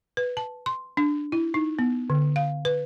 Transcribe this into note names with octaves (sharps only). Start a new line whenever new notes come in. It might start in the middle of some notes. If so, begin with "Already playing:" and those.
B4
A5
C6
D4
E4
D#4
B3
D3
F5
B4